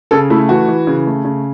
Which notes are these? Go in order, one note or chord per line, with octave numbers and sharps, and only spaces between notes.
C#3 A4
A3 E4
E3 F#4
E3
C#3
A3
C#3